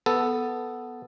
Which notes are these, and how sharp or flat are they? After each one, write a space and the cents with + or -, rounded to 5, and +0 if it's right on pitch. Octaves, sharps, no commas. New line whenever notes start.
B3 +0 A4 +0